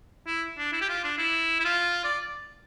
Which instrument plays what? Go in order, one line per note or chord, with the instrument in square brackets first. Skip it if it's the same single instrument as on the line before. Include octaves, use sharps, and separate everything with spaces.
[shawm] E4
D4
E4
G4
F4
D4
E4
E4
F4
D5